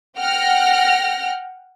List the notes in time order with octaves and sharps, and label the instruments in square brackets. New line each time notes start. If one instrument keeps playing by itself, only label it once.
[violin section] F#5 G5 F6 A#6